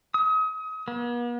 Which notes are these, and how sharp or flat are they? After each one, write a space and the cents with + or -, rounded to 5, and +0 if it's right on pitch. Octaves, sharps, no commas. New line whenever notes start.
D#6 +35
B3 -45